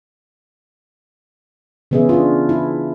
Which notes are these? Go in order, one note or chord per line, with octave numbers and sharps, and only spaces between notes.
C#3 E3 B3 C#4 G#4 E5
D4 F4
E4